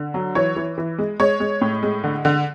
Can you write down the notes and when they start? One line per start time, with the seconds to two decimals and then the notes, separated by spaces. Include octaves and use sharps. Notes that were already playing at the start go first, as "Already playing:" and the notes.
Already playing: D3
0.14 F#3
0.35 E3 C#5
0.56 E3
0.78 E3
0.98 G#3
1.20 G#3 C#5
1.40 G#3
1.61 A2
1.83 G#3
2.04 D3
2.25 D3